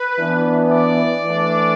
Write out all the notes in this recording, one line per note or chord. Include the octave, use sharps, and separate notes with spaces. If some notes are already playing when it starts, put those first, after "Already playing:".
Already playing: B4
E3 B3 D4
D5
E3 A3 D4